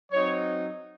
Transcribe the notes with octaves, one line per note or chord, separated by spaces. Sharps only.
F#3 C4 D#4 C#5